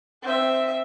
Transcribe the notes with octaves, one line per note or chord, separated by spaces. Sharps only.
C4 E5